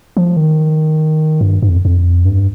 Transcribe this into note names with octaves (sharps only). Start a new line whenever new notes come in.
F3
D#3
G2
G2
F2
F2
G2